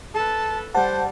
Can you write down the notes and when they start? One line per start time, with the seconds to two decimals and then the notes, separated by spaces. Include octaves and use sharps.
0.14 A4 B4 A5
0.75 G3 C5 F#5 A5